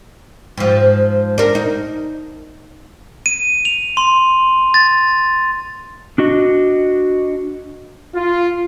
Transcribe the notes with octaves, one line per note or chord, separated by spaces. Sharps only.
G#2 F3
D4 A#4
D#4
D#7
F7
C6
A6
D4 F#4 D#5
F4